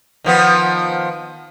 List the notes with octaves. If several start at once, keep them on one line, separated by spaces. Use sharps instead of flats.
D#3 F3 B3